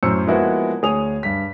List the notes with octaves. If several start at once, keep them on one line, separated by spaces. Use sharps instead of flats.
F#2 A2 C5 E6 C#7
F3 G#3 A#3 B3 E4 F#4
D2 G#4 C#5 D#6 F7
G2 B6